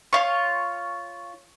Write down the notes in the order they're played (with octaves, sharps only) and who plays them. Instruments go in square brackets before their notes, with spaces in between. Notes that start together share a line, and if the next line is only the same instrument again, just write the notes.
[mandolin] F4 C#5